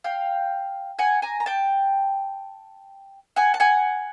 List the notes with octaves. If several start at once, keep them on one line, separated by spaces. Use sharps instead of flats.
F5 G5
F#5 G#5
G#5 A#5
A#5
G5 A5
F#5 G#5
A5
F#5 G#5